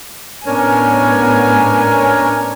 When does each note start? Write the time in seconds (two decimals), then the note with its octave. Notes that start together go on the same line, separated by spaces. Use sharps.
0.46 A2 B3 C#4 D4 A#4 C#5 G#5